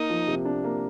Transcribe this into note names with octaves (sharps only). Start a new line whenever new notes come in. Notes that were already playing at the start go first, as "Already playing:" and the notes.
Already playing: A#3 D#4
F3
C3
D4
A#3